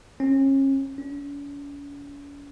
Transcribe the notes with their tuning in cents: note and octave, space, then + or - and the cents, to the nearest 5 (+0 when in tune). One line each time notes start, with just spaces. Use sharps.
C#4 -35
C#4 +45